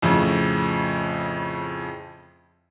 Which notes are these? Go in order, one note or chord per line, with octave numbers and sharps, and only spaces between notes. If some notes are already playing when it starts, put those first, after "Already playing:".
F2 A2 C#3